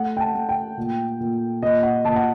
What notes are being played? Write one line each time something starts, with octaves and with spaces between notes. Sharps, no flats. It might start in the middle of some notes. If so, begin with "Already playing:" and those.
Already playing: A3 F#5
G5
A5
A3
G5
A#2
A#2
A#2 D#5
F#5
A#2 A5
F#5